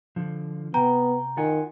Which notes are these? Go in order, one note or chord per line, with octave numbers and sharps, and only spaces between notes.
D3 F3
C3 B3 G5 A#5
D#3 F4 F#5 G#5